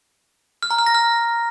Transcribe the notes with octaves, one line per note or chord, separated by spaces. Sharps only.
F6
A#5
F6
A#6
F6